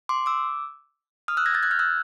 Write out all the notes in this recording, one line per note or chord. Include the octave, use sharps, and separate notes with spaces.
C6 D6
D6 E6
D#6 F6
E6 F#6
G#6 A#6
G6 A6
F#6 G#6
F6 G6
E6 F#6